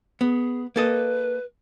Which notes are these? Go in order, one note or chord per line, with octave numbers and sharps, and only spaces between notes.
B3 G#4
A#3 A4 B4 D#5